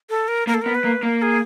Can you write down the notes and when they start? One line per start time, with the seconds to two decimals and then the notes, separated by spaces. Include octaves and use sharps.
0.10 A4
0.28 A#4
0.47 A#3 A#4
0.54 A4
0.62 B3 A#4
0.75 B4
0.84 A#3
1.02 A#3 A#4
1.22 G#4